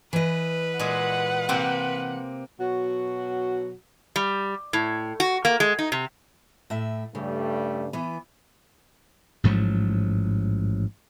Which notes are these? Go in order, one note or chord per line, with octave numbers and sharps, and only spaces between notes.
E3 B4 D#5
A#2 G#3 G#4 F#5
C3 A#3 C4
B2 F#3 F#4
G3
A2
F#4
A#3
G#3
D#4
C3
A2 E5
G2 C#3 G3 A3
E3 B3
A1 G#2 F3 F#3